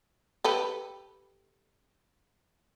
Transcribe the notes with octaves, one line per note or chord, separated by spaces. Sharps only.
G4 A4 B4